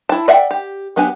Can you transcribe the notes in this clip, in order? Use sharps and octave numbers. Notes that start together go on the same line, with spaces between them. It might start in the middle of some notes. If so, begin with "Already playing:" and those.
E4 A5
D5 E5 F#5 G5
G4
F#3 B3 D4 G4 G#5